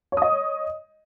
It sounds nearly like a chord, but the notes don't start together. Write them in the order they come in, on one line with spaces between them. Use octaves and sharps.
C#5 D#6 D#5